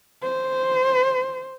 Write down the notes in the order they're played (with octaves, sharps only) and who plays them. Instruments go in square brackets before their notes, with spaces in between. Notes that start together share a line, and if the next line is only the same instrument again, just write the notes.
[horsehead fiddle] C5